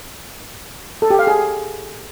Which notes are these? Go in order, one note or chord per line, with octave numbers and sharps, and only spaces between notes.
A4
G4
F5
G#4